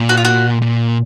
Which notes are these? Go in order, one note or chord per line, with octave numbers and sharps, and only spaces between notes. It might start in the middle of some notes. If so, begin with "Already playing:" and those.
Already playing: A#2
F#4
F4
F#4
A#2